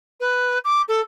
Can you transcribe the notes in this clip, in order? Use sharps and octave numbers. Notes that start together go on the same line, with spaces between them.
B4
D6
A4